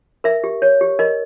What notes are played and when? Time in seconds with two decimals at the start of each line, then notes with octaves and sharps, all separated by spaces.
0.24 A#4 E5
0.44 G4
0.62 C#5
0.81 G4
0.99 A#4 D#5